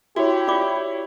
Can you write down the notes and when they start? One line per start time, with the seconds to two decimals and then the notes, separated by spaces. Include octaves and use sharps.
0.16 E4 F#4 G4 C#5
0.48 F4 D5 D6